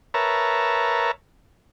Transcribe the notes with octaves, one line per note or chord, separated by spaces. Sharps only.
A#4 B4 C#5 E5 A5 A#5